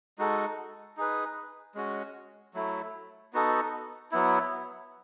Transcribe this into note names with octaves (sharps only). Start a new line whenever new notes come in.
G#3 D#4 F#4 A4
D#4 G#4 B4
G#3 C#4 F#4
F#3 A3 E4
B3 D#4 F#4 A4
F#3 B3 E4